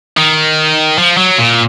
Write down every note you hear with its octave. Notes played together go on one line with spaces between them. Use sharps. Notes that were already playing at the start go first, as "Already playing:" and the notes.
D#3
F3
F#3
A#2